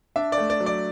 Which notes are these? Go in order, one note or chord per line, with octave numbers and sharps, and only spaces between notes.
D4 E5
D5
A3
D5
F#3
D5